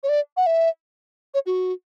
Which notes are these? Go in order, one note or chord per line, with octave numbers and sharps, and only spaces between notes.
C#5
D5
F#5
E5
C#5
F#4